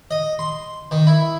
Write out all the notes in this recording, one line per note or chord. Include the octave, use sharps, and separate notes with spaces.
D#5
C6
D#3
E4